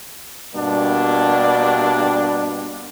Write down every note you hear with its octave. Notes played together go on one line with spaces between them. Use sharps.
G2 B2 G3 A#3 D4